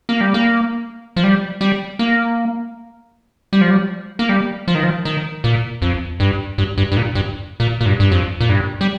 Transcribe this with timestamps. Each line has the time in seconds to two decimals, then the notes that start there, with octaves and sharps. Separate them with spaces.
0.09 A#3
0.21 G3
0.34 A#3
1.16 F3
1.24 G3
1.61 G3
1.99 A#3
3.53 G3
3.61 F3
3.70 G3
4.19 A#3
4.29 G3
4.68 F3
4.75 D#3
4.83 F3
5.05 D#3
5.44 A#2
5.82 F2
6.20 G2
6.58 G2
6.78 G2
6.92 G2
6.97 A#2
7.15 G2
7.60 A#2
7.81 A#2
7.86 G2
8.00 G2
8.11 F2
8.41 A#2
8.49 G2
8.81 G3